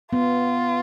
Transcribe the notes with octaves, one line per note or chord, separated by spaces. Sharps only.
B3 F4